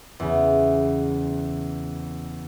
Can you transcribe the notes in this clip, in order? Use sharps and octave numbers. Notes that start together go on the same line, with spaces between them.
E2 C#3